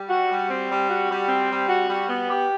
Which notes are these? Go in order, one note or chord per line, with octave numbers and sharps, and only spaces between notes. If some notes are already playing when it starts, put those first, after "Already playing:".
Already playing: G3
F#4
G3
C4
G3
F#4
G3
C4
G3
F#4
G3
B3
G4